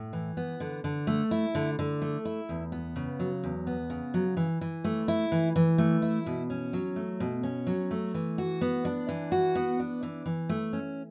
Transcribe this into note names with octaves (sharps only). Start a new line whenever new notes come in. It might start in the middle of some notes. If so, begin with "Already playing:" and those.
Already playing: A2
E3
B3
D3
D3
A3
E4
D3
D3
A3
E4
E2
B3
C#3
F#3
E2
B3
C#3
F#3
E3
E3
A3
E4
E3
E3
A3
E4
B2
C#4
F#3
A3
B2
C#4
F#3
A3
E3
F#4
B3
D4
E3
F#4
B3
D4
E3
E3
A3
C#4